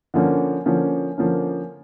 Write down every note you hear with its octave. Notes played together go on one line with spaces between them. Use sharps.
D3 F3 A#3 C#4
D3 F3 A#3 C#4
D3 F3 A#3 C#4